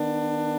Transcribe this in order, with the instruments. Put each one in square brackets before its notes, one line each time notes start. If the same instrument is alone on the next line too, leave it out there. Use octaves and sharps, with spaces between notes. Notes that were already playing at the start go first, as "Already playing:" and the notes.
Already playing: [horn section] D#3 B3 D4